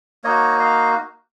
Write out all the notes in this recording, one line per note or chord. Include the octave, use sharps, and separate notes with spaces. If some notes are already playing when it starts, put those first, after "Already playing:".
A#3 D#4 F#4 C#5 D#5
D#5 F5